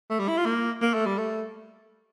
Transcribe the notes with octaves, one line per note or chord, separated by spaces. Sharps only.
A3
G3
E4
F4
A#3
A#3
A3
G3
A3